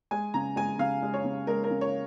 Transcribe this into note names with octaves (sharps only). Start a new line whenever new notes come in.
G#3 G#5
C#3 A#5
G#3 G#5
C#3 F5
G#3
C#5
C#3
G#3 A#4
A#4
C#3
C#5